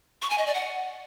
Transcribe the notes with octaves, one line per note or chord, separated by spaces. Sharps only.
C#6
G#5
D#5
D5
F#5